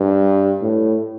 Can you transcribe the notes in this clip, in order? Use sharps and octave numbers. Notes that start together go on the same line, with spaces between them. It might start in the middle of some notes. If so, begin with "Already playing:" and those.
Already playing: G2
A2